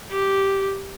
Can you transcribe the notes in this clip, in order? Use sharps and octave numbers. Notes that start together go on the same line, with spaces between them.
G4